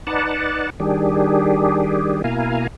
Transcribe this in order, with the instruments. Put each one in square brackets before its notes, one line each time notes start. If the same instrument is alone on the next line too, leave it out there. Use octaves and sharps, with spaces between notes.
[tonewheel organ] D#4 B4 D5 F#5 A5
D#3 G3 D4 G4 G#4
B2 A#3 E4 F5 G#5 A#5